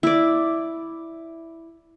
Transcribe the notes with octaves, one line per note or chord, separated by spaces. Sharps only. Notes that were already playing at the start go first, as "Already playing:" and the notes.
E4 D5